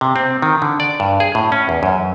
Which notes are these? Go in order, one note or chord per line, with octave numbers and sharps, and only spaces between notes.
C3
C4
D#3
D3
D5
G2
G#4
A2
C#4
E2
F#2